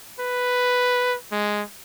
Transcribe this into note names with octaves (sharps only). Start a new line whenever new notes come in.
B4
G#3